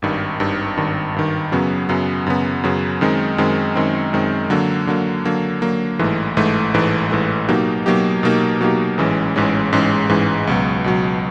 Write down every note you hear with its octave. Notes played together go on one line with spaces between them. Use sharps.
G#1 G2 D#3
G#1 G2 D#3
G#1 G2 D#3
G#1 G2 D#3
F#2 C#3 F#3 B3
F#2 C#3 F#3 B3
F#2 C#3 F#3 B3
F#2 C#3 F#3 B3
F#2 D#3 G#3 C4
F#2 D#3 G#3 C4
F#2 D#3 G#3 C4
F#2 D#3 G#3 C4
D3 F#3 A#3
D3 F#3 A#3
D3 F#3 A#3
D3 F#3 A#3
A1 G#2 E3 A3
A1 G#2 E3 A3
A1 G#2 E3 A3
A1 G#2 E3 A3
B2 F#3 A#3 D#4 G4
B2 F#3 A#3 D#4 G4
B2 F#3 A#3 D#4 G4
B2 F#3 A#3 D#4 G4
A1 G#2 E3 G#3 C#4
A1 G#2 E3 G#3 C#4
A1 G#2 E3 G#3 C#4
A1 G#2 E3 G#3 C#4
C#2 B2 F#3
C#2 B2 F#3